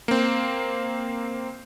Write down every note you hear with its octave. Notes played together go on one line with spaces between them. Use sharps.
A#3 C4